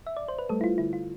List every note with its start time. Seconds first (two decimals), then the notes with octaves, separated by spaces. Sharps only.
0.07 E5
0.17 D5
0.28 C5
0.39 B4
0.49 G3 A3 A4
0.61 E4
0.64 F4
0.78 D3 E4
0.93 F4